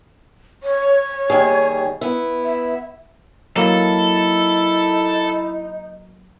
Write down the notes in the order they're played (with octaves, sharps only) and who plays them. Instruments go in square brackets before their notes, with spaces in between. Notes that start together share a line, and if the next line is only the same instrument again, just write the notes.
[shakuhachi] C#5
[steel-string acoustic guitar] D#2 G3 G#4
B3 E4
[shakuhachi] E5
[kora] F#3 A#3 [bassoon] D#4 [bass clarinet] E4 [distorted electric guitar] A4